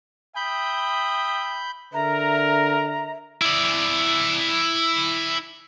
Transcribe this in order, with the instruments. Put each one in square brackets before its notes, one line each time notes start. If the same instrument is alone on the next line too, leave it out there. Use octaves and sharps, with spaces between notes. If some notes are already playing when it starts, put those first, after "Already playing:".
[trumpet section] E5 G5 D#6 [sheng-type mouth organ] B5 G6
[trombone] D3 [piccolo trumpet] A#4 [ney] E5 [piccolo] A#5
[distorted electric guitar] E4 D5